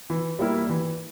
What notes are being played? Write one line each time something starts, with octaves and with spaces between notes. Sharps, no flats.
E3
G3 A#3 E4
E3